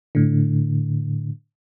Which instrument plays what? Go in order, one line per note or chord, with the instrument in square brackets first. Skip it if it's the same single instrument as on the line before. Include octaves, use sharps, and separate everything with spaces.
[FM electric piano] A2 D3